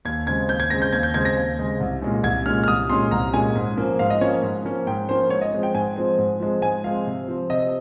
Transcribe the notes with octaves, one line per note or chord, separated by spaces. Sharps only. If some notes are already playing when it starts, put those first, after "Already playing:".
D#2 G#6
C#3 G#3 C4 G#6
D#2 G6
G#6
C#3 G#3 C4 A#6
G6
D#2 G#6
G6
C#3 G#3 C4 G#6
A#6
D#2
C#3 G#3 C4
C2
A#2 G#3 C#4
C2 G#6
A#2 G#3 C#4 F6
F6
C2 D#6
A#2 G#3 C#4 C6
C2 A#5
A#2 G#3 C#4 G#5
G#2
F3 A#3 C#4
G#2 F5
D#5
F3 A#3 C#4 C#5
G#2
F3 A#3 C#4
G#2 G5
F3 A#3 C#4 C5
G#2 C#5
D#5
F3 G#3 C4
G5
G#2 G#5
F3 G#3 C4
G#2
F3 G#3 C4
G#2 G#5
F3 G#3 C4 F5
C3
F3 C4
C3 D#5